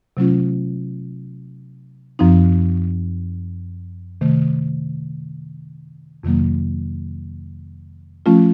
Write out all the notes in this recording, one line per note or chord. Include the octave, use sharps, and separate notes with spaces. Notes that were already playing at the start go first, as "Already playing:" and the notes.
C3 F#3 A3 C#4 F4
F#2 F3 C4 D#4
C3 D#3 A3
F2 C3 D#3 F#3 A#3
F3 A3 C#4 F4